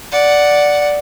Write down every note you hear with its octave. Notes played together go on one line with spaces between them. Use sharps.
D5 F#5